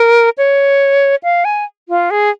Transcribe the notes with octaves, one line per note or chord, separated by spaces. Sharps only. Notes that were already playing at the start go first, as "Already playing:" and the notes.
Already playing: A#4
C#5
F5
G#5
F4
G#4